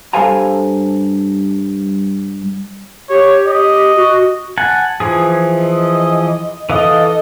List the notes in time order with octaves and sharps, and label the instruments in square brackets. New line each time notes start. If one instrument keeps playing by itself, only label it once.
[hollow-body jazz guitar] G2 A4 C5 F5 G#5 A#5
[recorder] G4 [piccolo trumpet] C#5
[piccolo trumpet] D#5
[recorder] F#4
[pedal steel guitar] F#5 G#5 A5
E3 F3 G#4
[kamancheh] D#5
[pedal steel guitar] E3 F5 D#6 [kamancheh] A4 D#5